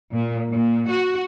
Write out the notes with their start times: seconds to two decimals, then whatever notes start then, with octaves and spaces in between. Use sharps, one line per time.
0.13 A#2
0.52 A#2
0.88 F#4